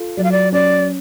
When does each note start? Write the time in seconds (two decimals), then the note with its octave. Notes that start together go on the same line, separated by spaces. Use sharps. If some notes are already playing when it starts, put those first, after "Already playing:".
Already playing: F4 A4
0.17 F#3 D5
0.24 F5
0.32 D5
0.52 C#4 D5